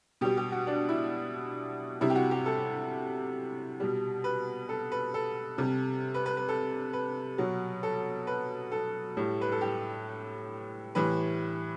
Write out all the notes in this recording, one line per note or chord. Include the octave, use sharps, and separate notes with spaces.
B2 G3 G4
G4
F#4
D4
E4
C3 G3 E4
G4
F#4
G4
A4
B2 G3
B4
A4
B4
A4
C3 G3
B4
B4
B4
A4
B4
B2 F#3
A4
B4
A4
A2 G3
B4
A4
G4
A2 E3 G3 B4